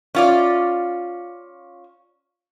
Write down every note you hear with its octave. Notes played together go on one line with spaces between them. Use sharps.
C#4 F4 D5